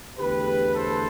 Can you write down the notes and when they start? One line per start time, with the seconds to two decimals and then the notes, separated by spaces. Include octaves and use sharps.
0.19 E2 D3 A3 G4 B4
0.75 A4 C5